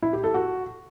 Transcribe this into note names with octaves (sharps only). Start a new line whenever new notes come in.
E4
G4
A4
F#4